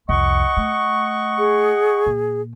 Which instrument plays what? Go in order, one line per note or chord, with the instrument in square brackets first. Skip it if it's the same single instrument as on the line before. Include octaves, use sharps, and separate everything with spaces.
[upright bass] C2 F2 [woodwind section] D#5 F#5 C#6
[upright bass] A3
[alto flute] G#4
[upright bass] A#2